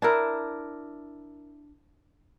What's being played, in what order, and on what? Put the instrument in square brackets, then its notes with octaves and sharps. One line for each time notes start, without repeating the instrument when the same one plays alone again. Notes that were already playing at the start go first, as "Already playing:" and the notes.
[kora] D4 E4 A#4